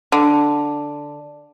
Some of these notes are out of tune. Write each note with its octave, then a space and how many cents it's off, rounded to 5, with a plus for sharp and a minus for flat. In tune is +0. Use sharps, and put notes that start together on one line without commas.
D3 +0